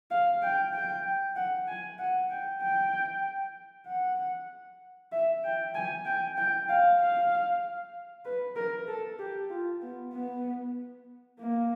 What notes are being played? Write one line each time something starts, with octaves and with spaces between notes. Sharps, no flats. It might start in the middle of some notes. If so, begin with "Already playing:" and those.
F5
G5
G5
F#5
G#5
F#5
G5
G5
F#5
E5
G5
G#5
G5
G5
F5
F5
B4
A#4
A4
G4
F4
B3
B3
A#3